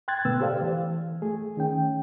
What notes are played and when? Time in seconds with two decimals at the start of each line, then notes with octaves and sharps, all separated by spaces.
0.08 G5 C6 F#6 G#6 A6
0.25 B2 D3 A3 B3 B4 E6
0.40 G4 A4 C5 D5 F5
0.62 E3
1.22 A3 G#4
1.57 D#3 C#4 G5